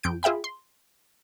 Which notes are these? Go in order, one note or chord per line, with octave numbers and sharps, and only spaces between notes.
F2 G6 D7
F4 G#4 E5 G5 B5
C6